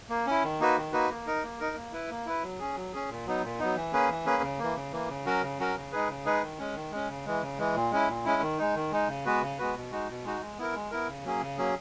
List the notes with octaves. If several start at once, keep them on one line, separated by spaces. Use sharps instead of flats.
A#3
C#4 E4
D#3
A#3 D#4 F#4 B4
D#3
A#3 D#4 F#4 B4
A#3
D#4 A#4
A#3
D#4 A#4
A#3
E4 B4
A#3
E4 B4
F#3
C#4 G#4
F#3
C#4 G#4
A#2
F#3 B3 D#4
A#2
F#3 B3 D#4
E3
A#3 C#4 G#4 B4
E3
A#3 C#4 G#4 B4
C#3
E3 A#3
C#3
E3 A#3
C#3
F#3 C#4 F#4 A#4
C#3
F#3 C#4 F#4 A#4
C#3
G#3 D#4 G#4 B4
C#3
G#3 D#4 G#4 B4
D#3
G#3 C#4
D#3
G#3 C#4
C#3
E3 G#3
C#3
E3 G#3
A#2
G#3 C#4 E4
A#2
G#3 C#4 E4
D#3
G#3 D#4
D#3
G#3 D#4
C#3
G#3 B3 F#4 B4
C#3
G#3 B3 F#4 B4
B2
G#3 D#4 F#4
B2
G#3 D#4 F#4
G#3
B3 E4 A#4
G#3
B3 E4 A#4
C#3
F#3 A#3 C#4 G#4
C#3
F#3 A#3 C#4 G#4